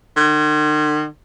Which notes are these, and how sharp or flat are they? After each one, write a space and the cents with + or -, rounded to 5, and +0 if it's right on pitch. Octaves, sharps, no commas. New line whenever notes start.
D#3 -45